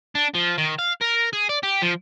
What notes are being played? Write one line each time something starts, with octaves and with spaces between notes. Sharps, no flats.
D4
F3
D#3
F5
A#4
G#4
D5
G4
F3